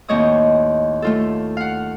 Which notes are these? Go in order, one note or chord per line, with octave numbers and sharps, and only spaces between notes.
D#2 A2 C4 C#5 D#5 D#6
A3 F4 A4
F5 F#5